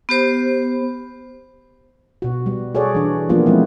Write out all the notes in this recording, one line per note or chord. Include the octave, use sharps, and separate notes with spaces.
B3 G4 C5
B2 F#4
G3
F#4 G#4 A4 C#5 D5
E3 D4
F3 G3 A#3 B3 D4 F4
G#3 A3 C4 E4